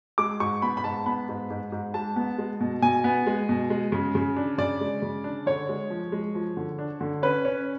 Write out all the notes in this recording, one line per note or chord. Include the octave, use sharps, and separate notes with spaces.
G#3 D6
G#2 C#6
B3 B5
B5
G#2 A5
B3 B5
G#2
G#2
G#2
G#3 A5
B3
G#3
B2
B2 G#5
B3
G#3
B2
G#3
C#3
C#3
D4
C#3 D5
G#3
C#3
D4
D3 C#5
G#3
F3
G#3
F3
D3
D4
D3
C#4 B4
C#4